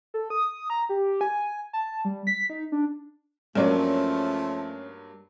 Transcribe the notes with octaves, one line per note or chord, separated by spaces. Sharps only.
A4
D#6
A#5
G4
G#5
A5
G3
B6
D#4
D4
G2 F3 F#3 A3 A#3 C#4 D5